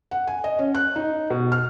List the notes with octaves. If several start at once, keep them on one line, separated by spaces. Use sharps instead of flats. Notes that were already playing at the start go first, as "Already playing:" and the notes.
F#5
G#5
D#5
C#4
F#6
D#4
B2
F6